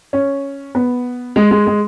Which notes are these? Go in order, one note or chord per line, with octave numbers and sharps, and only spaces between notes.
C#4
B3
G#3
G#3
G#3